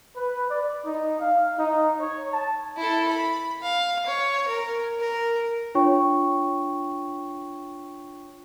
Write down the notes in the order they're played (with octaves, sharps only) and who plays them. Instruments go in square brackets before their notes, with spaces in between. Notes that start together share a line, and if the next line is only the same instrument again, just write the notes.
[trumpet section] B4
D5
D#4
F5
D#4
C#5
A5
[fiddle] E4 A4
B5
F5
C#5
A#4
A#4
[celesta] D4 F4 C#5 G5 C#6